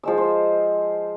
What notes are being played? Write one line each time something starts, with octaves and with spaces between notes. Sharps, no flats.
F3 G#3 E6
C5